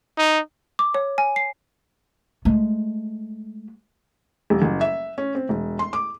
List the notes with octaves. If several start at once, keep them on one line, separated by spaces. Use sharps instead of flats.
D#4
D6
C#5
G#5
C7
G#3 A3
D#1
F#1
E5
C#4
C4
E1
C6
D6